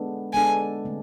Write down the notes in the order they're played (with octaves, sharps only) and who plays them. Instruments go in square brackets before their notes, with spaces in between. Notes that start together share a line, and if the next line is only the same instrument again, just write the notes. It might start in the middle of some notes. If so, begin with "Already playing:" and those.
Already playing: [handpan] G#3 B3 D4 A4
[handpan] G#3 B3 D4 A4 [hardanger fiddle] G#5
[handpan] D3 A3 C4